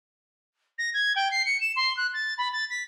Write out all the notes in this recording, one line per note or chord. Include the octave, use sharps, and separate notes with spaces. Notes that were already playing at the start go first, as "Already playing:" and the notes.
A#6
G#6
G5
C7
C#7
E7
C6
F#6
A6
B5
A6
B6